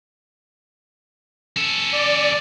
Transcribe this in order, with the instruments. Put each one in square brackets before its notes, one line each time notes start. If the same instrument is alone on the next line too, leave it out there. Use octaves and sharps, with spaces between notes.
[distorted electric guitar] C#4 A4
[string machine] D5